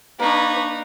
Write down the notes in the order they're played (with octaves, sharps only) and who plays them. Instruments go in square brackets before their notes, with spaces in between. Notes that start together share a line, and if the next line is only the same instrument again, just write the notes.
[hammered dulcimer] A#3 D4 [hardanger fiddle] D#4 [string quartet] B4 C#6